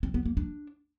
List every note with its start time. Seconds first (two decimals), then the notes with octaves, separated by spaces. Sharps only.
0.03 C4
0.14 B3
0.26 A#3
0.37 D4